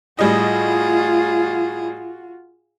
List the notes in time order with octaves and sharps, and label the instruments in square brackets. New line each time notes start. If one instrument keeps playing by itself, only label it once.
[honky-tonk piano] A2 G3 D#5 [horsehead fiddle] F4 F#4 [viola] G#4